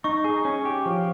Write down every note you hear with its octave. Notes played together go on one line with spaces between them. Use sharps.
D#4 C#6
G#4
C#4
G4
F3